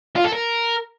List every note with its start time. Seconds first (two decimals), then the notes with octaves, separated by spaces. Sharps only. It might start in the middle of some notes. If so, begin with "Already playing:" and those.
0.16 F4
0.24 A4
0.33 A#4